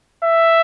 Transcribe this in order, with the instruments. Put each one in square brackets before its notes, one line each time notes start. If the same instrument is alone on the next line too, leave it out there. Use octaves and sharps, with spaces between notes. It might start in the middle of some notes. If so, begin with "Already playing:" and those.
[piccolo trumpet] E5